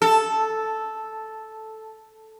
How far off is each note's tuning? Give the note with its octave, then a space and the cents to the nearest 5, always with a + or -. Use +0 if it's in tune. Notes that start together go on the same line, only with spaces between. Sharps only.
A4 -5